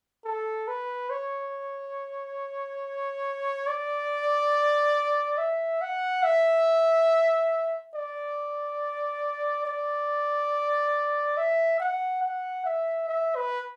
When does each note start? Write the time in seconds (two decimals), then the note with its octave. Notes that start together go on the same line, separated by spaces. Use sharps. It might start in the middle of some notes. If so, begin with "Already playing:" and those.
0.25 A4
0.68 B4
1.10 C#5
3.67 D5
5.38 E5
5.81 F#5
6.23 E5
7.95 D5
9.66 D5
11.37 E5
11.80 F#5
12.23 F#5
12.65 E5
13.08 E5
13.36 B4